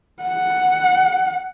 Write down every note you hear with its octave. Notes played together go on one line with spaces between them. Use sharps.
F#5